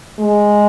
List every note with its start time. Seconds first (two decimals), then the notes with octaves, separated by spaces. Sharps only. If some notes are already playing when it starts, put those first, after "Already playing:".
0.19 G#3